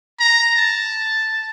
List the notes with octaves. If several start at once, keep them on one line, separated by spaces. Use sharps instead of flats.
A#5
A5